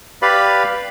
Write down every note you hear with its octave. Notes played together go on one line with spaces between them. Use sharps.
G4 B4 D5 F5 B5